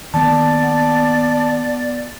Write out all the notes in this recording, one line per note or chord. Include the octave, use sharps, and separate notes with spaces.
D#3 A#3 B3 D5 A5